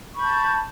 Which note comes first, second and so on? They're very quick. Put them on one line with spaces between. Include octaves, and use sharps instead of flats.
C#6 B5 G6 A5